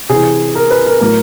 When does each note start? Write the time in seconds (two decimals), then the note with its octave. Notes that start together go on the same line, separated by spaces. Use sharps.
0.09 C3 E3 G#4
0.55 A#4
0.71 B4
0.86 A#4
1.01 A2 F#3 A#4